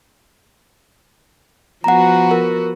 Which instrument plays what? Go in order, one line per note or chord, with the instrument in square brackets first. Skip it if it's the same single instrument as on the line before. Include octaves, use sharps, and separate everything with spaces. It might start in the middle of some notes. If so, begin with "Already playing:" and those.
[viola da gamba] F3 B3 F#4 [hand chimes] F#5 A#5
[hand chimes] A#4